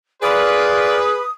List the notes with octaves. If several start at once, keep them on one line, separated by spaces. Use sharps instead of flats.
F4 G#4 A#4 B4 D5 D#6